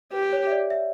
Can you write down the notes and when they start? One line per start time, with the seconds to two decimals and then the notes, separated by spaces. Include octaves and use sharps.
0.13 G4 B4
0.33 C#5
0.47 E5
0.52 D5
0.70 E5